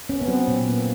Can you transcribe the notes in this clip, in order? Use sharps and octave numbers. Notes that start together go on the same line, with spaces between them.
B3 C#4
B3
F#3 C4
A#2
A#3